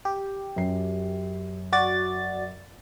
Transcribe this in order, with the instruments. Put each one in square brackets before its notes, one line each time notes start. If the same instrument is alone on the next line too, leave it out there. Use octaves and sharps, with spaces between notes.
[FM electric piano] G4
[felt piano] F#2 C7
[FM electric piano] F#4 D5 A6